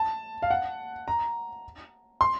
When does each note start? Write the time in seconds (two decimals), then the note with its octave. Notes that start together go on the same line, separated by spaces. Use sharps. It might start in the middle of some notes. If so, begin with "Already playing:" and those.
Already playing: A5
0.42 F5
0.50 F#5
1.08 A#5
2.21 C6